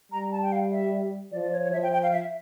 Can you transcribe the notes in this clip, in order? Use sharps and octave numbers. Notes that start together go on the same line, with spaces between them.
G3 A#5
A5
G5
F5
E5
F3 D5
D5
C#5
C#5
F3 E5
G5
G5
F5
E5